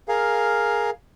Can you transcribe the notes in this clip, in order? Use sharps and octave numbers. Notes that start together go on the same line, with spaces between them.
G#4 A#4 F5